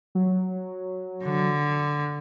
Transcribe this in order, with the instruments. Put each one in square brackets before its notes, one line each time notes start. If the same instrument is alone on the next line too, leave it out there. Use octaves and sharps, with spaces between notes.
[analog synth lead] F#3
[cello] D3